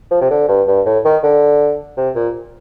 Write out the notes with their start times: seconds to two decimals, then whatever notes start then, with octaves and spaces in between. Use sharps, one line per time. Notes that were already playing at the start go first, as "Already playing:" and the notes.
0.11 F3
0.21 C3
0.31 D3
0.48 G2
0.68 G2
0.86 A2
1.05 D#3
1.23 D3
1.97 C3
2.16 A#2